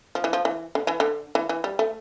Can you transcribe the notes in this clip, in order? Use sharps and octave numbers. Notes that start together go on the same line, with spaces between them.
F3
E3
F3
E3
D3
E3
D3
E3
E3
G3
A3